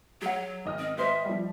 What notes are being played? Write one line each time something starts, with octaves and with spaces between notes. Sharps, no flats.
F#3 G#4 F#5
G#1 D#5 F6
C4
B4 C5 E5
F3 G3